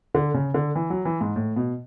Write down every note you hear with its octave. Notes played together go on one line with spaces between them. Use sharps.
D3
C#3
D3
E3
F#3
E3
G#2
A2
B2